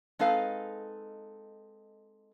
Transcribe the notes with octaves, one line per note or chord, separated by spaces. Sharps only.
G#3 C4 D#4 A4 B4 F5